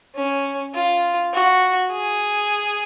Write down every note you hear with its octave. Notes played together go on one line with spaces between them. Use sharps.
C#4
F4
F#4
G#4